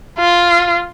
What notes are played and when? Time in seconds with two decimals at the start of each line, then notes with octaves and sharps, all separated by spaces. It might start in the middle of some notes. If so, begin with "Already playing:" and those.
0.20 F4